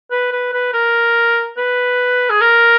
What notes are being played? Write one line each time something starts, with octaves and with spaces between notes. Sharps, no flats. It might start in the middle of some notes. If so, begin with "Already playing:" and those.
B4
B4
B4
A#4
B4
G#4
A#4